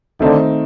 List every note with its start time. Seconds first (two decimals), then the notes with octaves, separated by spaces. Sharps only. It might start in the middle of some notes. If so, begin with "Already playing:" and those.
0.20 D3 D#3 A3 C4 D#4